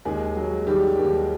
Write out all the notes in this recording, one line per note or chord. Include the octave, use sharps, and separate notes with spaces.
D#2 G#3 G#4
F#3
D#3 G3 G4
D#2